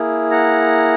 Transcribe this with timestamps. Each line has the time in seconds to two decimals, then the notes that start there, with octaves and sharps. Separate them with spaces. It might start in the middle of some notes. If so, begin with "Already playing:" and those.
Already playing: A#3 E4 G#4
0.31 F#5 A#5